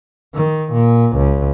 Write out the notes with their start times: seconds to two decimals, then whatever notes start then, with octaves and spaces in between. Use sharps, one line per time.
0.35 D#3
0.73 A#2
1.17 C#2